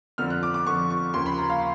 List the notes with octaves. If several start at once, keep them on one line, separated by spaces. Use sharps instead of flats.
F2 D3 F3 F6
F#6
D6
D6
F2 D3 F3 C#6
C#6
D#2 C#3 F3 A#3 C6
B5
A#5
F5